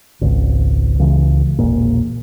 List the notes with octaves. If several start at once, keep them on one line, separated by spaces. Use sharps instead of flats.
G#1 C#2
C#2 C#3 E3
E1 A#1 A#2